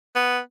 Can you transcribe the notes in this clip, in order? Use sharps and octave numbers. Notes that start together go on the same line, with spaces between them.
B3